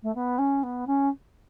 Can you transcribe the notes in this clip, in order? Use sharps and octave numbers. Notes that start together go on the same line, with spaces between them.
A3
B3
C#4
B3
C#4